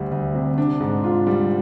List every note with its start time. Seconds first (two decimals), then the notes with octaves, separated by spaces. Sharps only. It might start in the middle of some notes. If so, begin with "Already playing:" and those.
Already playing: D2 G3
0.11 D2
0.35 C3
0.58 D4
0.81 G#2
1.04 F4
1.27 G3